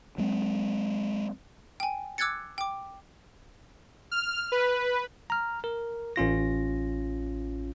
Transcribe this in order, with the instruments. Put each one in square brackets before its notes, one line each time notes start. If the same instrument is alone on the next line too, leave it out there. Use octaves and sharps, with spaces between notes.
[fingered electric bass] F#3 G#3 C4
[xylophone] G5 G#5
D6 E6 F#6 G#6 A6 C#7
G5 D6
[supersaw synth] F6
B4
[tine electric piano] A#5 F6
A#4
A1 C#4 F4 A#6